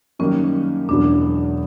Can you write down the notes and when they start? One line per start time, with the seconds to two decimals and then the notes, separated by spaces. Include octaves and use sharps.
0.19 F#2 D#3 G3 A#3 C#4
0.88 E1 E2 B2 F#3 D4